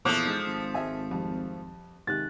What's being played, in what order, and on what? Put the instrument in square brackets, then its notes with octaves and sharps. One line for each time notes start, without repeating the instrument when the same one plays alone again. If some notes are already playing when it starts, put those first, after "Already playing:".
[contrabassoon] E2 [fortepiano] A#2 [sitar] F3 A3 [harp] D6 D#6 F#6
[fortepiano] G#3 D#4
[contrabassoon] G#1
[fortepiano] G#3 E5 G#5
F2 G3
[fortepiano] G#2 C3 D#3 [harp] F#6 A6